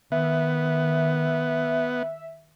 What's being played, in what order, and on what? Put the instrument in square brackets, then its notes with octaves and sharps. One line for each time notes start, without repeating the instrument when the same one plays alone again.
[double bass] D#3 [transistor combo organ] B3 [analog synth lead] E5